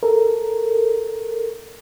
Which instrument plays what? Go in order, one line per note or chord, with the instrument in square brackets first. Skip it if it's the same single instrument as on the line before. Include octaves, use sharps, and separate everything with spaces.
[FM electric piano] A4 A#4